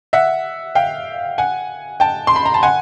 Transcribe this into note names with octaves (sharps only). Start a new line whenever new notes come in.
E5 F#5
F5 G5
F#5 G#5
G5 A5
C6
B5
A#5
A5
F#5 G#5